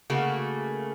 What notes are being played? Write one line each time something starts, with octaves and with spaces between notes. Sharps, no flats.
C#3 A3 A#3 F#4